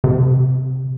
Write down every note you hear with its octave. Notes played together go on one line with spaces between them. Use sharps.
C3